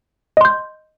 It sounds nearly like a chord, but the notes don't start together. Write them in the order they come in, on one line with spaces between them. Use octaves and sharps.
D#5 C6 G6